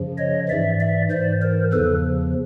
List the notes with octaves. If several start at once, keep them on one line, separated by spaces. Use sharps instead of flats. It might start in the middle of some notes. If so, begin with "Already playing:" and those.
Already playing: F#2 C#3 F3
C#5 D#5
G#2 E3 D5 E5
D5 E5
G#2 E3 C5 D5
A#4 C5
E2 C#3 F3 A4 B4